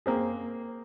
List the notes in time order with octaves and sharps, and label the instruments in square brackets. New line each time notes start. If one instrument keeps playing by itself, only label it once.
[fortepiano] A#3 C4 G#4